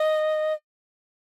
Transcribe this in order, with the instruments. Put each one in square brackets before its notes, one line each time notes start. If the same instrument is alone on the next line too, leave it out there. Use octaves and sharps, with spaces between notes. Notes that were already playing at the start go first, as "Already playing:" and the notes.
Already playing: [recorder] D#5